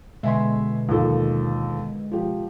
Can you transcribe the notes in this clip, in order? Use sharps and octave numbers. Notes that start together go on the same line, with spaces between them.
B2 D3 G#3 E5 G#5 C6
D#2 F3 A4
F3 G4